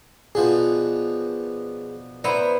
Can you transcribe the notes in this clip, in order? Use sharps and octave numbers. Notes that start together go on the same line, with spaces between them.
B2 F3 D4 G#4
B3 E4 C5 D5 A#5